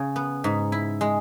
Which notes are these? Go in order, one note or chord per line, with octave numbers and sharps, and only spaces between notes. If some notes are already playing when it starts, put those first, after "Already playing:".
Already playing: C#3
B3
G#2
E4
G#3